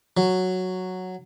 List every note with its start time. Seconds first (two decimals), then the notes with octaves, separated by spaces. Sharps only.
0.17 F#3